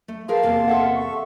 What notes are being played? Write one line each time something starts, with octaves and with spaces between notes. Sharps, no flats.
A3
G#4 A#4 B4 F5 A5 C6
E2 C3 A#3
A4 E5 F#5
C#6